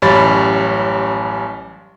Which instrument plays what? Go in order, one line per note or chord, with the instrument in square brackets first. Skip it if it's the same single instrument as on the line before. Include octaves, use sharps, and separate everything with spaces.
[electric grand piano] A1 F#2 G3 C#5 B5 A6